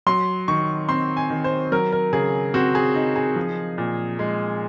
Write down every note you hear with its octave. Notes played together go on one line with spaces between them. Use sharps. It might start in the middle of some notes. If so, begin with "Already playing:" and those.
F#3 C6
D#3 C#6
C4 C6
G#5
D#3
C5
F#3 A#4
A#4
C#3 G#4
C4 F#4
G#4
D#4
G#4
F3
A#2
G#3